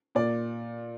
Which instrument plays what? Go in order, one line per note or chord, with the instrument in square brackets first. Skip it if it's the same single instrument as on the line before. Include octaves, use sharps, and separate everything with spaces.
[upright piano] A#2 D5